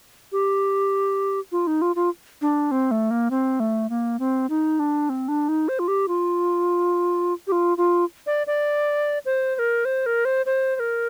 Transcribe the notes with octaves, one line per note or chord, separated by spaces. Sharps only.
G4
F4
D#4
F4
F4
D4
C4
A3
A#3
C4
A3
A#3
C4
D#4
D4
C4
D4
D#4
C5
F4
G4
F4
G4
F4
F4
D5
D5
C5
C5
A#4
C5
A#4
C5
C5
C5
A#4